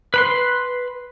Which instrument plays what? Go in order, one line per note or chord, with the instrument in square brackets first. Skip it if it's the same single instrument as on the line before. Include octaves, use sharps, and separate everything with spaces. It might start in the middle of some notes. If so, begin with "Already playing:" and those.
[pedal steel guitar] B4 B5 C6